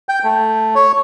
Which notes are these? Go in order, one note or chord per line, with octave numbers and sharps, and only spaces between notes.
G5
A3
C#5